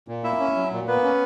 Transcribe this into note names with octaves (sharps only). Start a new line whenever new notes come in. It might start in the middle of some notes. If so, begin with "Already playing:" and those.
A#2
A#3 E4 E5
C#4
F#3
A#2
A#3 B3 B4
C#4